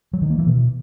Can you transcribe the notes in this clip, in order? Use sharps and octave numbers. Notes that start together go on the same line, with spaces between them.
F#3
D#3
A#3
E3
B2